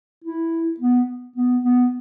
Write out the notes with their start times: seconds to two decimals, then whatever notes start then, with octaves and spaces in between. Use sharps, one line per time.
0.24 E4
0.80 B3
1.36 B3
1.64 B3